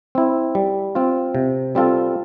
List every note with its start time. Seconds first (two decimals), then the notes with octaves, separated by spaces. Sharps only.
0.15 C4 E4
0.55 G3
0.95 C4 F4
1.35 C3
1.75 G3 C4 F4 A4